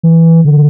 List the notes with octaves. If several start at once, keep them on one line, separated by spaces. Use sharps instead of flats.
E3
D3